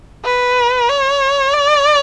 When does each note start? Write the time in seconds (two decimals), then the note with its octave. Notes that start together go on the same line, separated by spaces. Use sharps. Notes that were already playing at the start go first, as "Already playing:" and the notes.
0.25 B4
0.89 C#5
1.54 D5